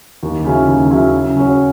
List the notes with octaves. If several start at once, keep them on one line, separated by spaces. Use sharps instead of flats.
D#2
C#3 F#3 C#4 E4
D#2
C#3 F#3 C#4 E4
C#3
F#3 C#4 F#4 C#5